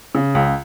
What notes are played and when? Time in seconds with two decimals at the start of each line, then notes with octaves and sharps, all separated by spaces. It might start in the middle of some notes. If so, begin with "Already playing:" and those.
0.15 C#3
0.35 C#2